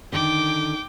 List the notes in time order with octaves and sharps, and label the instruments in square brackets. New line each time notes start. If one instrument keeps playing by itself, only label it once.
[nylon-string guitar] D3 D#3 [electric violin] G5 D6